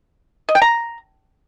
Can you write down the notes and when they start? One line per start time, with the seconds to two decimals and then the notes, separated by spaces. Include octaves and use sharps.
0.49 D#5
0.55 G5
0.62 A#5